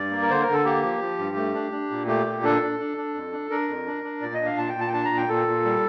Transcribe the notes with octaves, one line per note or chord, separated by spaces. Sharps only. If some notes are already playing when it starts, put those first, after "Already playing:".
Already playing: G2 D5
A#3
A#4
D3 C5
A#4
D3
A4
A#3 G4
F3
F3
G2
A3
D4
D4
A#2
A3 G4
A#2
D4 A4
D4
D4
D4
F2
D4
D4 A#4
F2
D4
D4
A#2 D5
D#5
D4
F5
A#2 A5
G5
A#2 A5
G5
D4 A5
A#5
A#2
G5
A#2 A4
A#2
G3